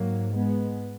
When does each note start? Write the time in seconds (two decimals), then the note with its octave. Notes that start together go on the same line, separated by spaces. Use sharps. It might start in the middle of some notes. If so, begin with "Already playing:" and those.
Already playing: G#2 F#3 A#3
0.36 G#3 B3